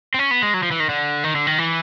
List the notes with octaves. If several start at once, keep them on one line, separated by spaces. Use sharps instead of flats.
C4
C#4
B3
G#3
F#3
F3
E3
D#3
D3
D#3
D3
D#3
E3